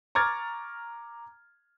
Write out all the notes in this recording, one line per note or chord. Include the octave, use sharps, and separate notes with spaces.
A#5 C#6 D6 F6 G#6 A6